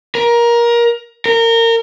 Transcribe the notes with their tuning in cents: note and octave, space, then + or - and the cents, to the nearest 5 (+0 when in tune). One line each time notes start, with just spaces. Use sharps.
A#4 +20
A#4 -25